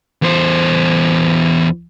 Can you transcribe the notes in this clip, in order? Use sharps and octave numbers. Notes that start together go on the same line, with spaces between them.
E2 C5